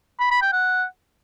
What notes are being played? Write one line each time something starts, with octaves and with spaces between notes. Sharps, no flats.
B5
B5
G5
F#5